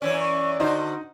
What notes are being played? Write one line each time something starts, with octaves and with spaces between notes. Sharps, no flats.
F#2 E3 C#4 C#5 D5
C#6
D3 D#4 F#4 C5 D#5